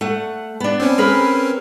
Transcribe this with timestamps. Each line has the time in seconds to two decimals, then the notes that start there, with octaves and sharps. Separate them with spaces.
0.01 A3 F#5
0.60 B3 D4
0.80 C4 C#4
0.98 G#4 A#4 B4